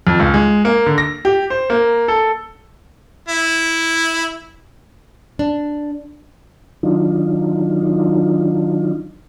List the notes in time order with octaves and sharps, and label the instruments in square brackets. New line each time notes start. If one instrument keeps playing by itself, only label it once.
[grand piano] F2
C#2
G#3
A#3
D3
A#6
G4
C5
A#3
A4
[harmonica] E4
[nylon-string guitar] D4
[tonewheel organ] D#3 F#3 D4 D#4 F4